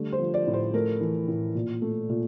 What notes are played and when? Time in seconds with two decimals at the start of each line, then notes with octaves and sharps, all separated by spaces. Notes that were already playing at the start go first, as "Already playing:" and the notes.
Already playing: D3 G3 A3
0.12 C5
0.20 F3
0.34 D5
0.47 A2
0.54 C5
0.74 A3 A#4
1.01 E3
1.28 A2
1.55 A#2
1.82 A3
2.09 A#2